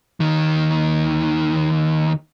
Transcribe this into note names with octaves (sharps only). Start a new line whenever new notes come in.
D#2 D#3